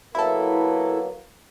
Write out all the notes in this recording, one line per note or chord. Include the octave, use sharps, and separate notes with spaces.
F#3 A#3 B3 E4 A4